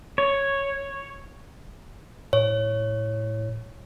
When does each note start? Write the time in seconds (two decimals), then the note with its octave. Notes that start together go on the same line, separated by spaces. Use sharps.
0.18 C#5
2.33 A2 C#5